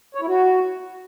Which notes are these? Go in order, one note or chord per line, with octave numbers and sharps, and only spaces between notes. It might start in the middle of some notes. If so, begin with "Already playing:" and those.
C#5
E4
F#4